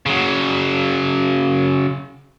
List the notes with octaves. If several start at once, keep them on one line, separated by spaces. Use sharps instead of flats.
C#3 F#3